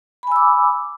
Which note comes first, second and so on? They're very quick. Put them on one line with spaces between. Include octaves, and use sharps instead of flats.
B5 G#5 E6 D6